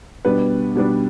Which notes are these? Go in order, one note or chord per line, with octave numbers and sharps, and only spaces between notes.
B2 G3 B3 D4 B4
B2 G3 B3 D4